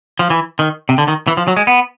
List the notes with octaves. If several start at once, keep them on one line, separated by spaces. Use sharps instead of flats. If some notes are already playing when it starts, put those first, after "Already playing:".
F3
E3
D#3
C3
D3
D#3
E3
F3
F#3
G#3
B3